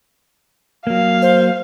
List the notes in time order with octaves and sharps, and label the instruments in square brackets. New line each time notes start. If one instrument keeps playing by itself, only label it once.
[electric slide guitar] F#3 A#3 [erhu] F5
[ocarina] C5